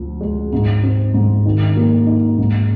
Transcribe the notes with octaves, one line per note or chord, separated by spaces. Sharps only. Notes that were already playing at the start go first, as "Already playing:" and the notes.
Already playing: D2 F3
G#3
G#2
C4
G#2
D#3
A#3
D#4
G#2